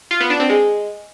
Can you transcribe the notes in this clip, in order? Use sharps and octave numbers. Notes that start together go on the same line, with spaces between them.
F4
B3
D4
C4
G#3